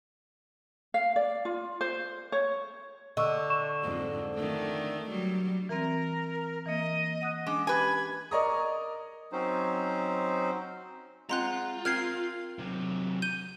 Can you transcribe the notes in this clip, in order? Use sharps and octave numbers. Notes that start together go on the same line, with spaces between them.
F5
D5
F4
C5
C#5
D3 D#5 C#6 E6
C#6 E7
F2 G#2
D#3 A3 D4
F#3 G3
E3 C4 A#4
E3 A#3 D#5
F#5 D#6 F#6
G#3 C#4 D4 D6
G4 B4 G#5 D6 G#6
A#4 D5 D#5 A#5 C#6 D#6
F#3 C4 C#4 D#4 C5
G#3 C4 F4 F#5 A#5 C6 F#6
C4 A#4 F6 G#6 C7
C3 F#3
G6 D#7 G7